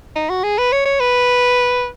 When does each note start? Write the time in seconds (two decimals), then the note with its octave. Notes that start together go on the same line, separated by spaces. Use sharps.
0.16 D#4
0.30 F#4
0.44 G#4
0.58 B4
0.72 C#5
0.85 C#5
1.00 B4